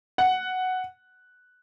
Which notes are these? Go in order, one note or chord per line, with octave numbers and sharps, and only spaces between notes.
F#5